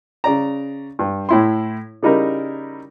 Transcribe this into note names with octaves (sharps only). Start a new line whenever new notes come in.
C#3 D5 A#5
G2
A2 E4 C6
C#3 G3 D#4 E4 A#4